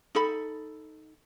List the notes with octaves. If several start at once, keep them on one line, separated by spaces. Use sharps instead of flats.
D#4 A4 B5